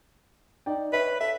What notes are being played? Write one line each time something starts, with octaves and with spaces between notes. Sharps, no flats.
D#4 D5 G5
B4 C#5 E5
A4 E5